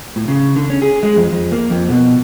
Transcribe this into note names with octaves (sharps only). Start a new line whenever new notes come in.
A2
C#3
D3
C#4
G#4
G#3
F2
F2
A#3
F2
B2